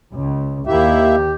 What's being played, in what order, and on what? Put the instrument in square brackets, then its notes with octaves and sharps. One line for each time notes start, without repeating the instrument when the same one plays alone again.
[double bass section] C#2
[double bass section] D#2 D#3 [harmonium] A#3 E4 E5 [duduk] G4